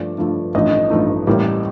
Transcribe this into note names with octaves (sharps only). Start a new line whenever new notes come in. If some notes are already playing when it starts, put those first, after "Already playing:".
Already playing: G2 F3 A3 D5
G2 F3 A3
A1 G2 F3 A3 D#4 D#5
A1 G2 F3 A3 D#4
A1 A2 G3 A#3